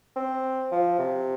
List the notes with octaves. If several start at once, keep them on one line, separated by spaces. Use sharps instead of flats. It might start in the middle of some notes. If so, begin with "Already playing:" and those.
C4
F3
C3